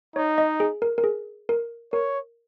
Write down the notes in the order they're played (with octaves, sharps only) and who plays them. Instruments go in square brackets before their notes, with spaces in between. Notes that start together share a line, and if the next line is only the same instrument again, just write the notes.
[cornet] D#4 [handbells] C#5
[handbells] D#5
G#4
A#4
A#4
G#4
A#4
[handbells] A#4 [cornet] C#5